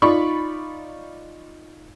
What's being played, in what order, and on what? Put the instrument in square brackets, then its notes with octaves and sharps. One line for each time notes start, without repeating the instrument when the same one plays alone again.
[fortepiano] D#4 F4 D5 B5 C#6